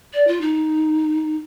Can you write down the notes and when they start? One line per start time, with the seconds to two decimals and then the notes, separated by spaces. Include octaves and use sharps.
0.13 D5
0.27 F4
0.41 D#4